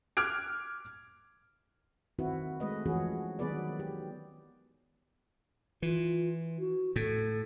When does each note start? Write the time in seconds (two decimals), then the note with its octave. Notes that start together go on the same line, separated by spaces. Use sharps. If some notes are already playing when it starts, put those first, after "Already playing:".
0.17 D6 F6 F#6 G#6 D7
2.19 D#3 C4 E4 F#4 B4
2.60 G#3 A3 B4 D#5
2.86 E3 F3 C#4 F#4 G#4
3.39 D#3 F#3 B3 G#4 B4 D5
3.79 G4
5.82 E3 F4
6.59 F#4
6.96 A2 A4